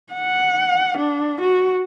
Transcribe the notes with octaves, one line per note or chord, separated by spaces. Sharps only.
F#5
D4
F#4